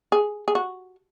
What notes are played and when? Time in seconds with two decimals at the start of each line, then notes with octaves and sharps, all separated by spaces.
0.12 G#4
0.48 G#4
0.55 F#4